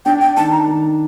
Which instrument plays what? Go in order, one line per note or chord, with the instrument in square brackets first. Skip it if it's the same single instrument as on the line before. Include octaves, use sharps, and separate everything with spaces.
[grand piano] D4 [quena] G5
[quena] G5
[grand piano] D#3 [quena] A5
[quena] A#5
[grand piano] D#3